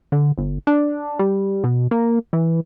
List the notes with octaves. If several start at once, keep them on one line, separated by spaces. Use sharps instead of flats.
D3
G1
D4
G3
B2
A#3
E3